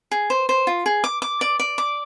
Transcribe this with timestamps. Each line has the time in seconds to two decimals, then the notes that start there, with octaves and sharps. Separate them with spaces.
0.11 G#4
0.30 C5
0.49 C5
0.67 F4
0.86 G#4
1.04 D6
1.22 D6
1.41 D5
1.59 D5
1.78 D6